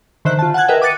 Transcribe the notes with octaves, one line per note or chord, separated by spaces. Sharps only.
D3 D#3 C5 E5 F#6
F4 A5
F#5 G#5 A5 F#6 G#6
A#4 B4 D#5 E5 G5
D6 D#6 F#6 A6 C#7 D#7